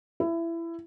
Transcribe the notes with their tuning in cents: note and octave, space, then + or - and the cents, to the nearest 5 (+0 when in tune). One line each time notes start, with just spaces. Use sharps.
E4 +20